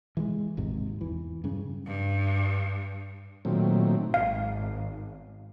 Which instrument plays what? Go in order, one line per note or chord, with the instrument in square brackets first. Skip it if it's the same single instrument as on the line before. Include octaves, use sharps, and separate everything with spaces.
[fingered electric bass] E3 F#3 G#3
G#1 D#2 G#2 C3
E2 E3
G2 C#3
[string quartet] G2
[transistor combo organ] A#2 D#3 F#3 A3 C4
[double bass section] G#1 [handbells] F5